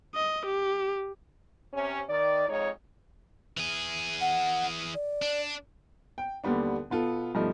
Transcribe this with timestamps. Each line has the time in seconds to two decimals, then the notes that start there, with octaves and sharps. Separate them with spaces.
0.15 D#5
0.46 G4
1.72 C3 C#4
2.08 D#3 D5
2.46 F2 G#3 D#4 C#5
3.57 E3 G#4
4.21 F#5
4.94 D5
5.22 D4
6.18 G5
6.44 D#2 D3 G3 B3 D4
6.90 B2 B3 F4 A4
7.35 G2 B2 F3 A3 D#4